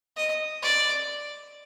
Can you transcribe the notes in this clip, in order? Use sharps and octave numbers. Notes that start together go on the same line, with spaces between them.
D#5
D5